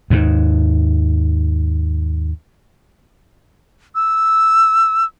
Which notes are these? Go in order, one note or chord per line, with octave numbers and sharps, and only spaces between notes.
D#2 G#2
E6